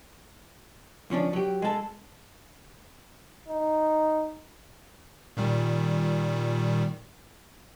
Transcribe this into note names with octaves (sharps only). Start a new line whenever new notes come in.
C#2 F3 C#4 D4
F#3 G4
G#3 A4
D#4
A#2 D#3 G3